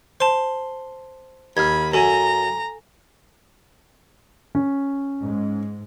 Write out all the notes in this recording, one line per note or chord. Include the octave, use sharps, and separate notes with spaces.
C5 A5 C6
D#2 B5 F6 G#6
F#2 A4 G#5 A#5
C#4
G#2 G#3